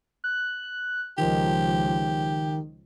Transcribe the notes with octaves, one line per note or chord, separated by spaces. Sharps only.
F#6
C#2 D#3 F3 G4